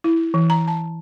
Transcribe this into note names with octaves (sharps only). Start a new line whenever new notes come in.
E4
E3
A#5
A5